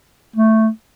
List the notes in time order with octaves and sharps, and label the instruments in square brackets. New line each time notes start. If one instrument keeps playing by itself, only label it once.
[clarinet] A3